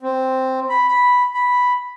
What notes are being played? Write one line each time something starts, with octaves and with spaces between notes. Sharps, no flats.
C4
B5
B5
B5